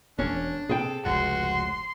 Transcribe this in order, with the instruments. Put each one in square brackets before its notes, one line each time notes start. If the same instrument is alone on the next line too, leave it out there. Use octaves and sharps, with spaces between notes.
[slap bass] E1 [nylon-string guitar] C#4 [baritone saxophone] D4
[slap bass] C3 [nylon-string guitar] G#4 G5 [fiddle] A4
[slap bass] F1 C#2 G#2 [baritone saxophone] F#4 [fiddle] C6